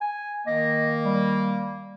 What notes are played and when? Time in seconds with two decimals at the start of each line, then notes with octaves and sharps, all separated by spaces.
0.01 G#5
0.47 D#3 A#3 D#5
1.05 G3